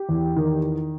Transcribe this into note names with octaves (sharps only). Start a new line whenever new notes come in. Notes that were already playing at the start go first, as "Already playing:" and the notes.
Already playing: G4
E2
D#3